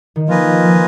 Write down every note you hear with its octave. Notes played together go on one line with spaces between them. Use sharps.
D#3
F3 A#3 F4 B4 D#5 G#5
F3